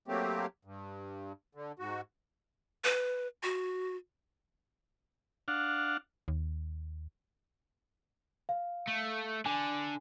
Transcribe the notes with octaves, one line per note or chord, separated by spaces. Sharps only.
F#3 A3 A#3 C4 G4
G2
D3
G#2 F#4
B4
F#4
D4 F5 F#5
D#2
F5
A3
D3 G#5